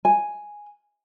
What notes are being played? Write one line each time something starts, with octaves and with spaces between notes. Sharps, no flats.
G#5